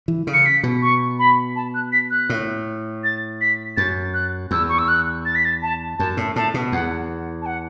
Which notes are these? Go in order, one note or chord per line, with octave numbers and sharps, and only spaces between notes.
E3
C#3
C#7
B6
B2
C#6
B5
A5
F#6
B6
F#6
A2
A6
B6
F#2 A6
F#6
E2 E6
C#6
E6
F#6
A6
B6
A6
A5
F#2 A5
A2
A2 A5
B2
E2 F#5
A5
F#5